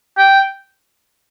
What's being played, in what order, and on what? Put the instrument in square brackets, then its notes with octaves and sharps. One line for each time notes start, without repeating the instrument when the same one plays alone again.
[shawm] G5